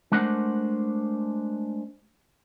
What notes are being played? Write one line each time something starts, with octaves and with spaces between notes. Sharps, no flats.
G#3 A3 D4 A#4 C5 F#5